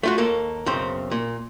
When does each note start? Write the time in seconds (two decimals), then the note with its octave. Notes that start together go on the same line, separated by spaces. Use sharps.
0.03 A3 F4 F#4
0.18 D#2 A#3 A4
0.66 B1 F#2 C#3 C4 C5
1.11 A#2